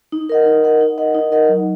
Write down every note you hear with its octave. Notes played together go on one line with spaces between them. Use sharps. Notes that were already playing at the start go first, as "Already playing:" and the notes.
D#4
A#4 D#5 F#5
D#4
A#4 D#5 F#5
D#4
A#4 D#5 F#5
D#4
A#4 D#5 F#5
F#3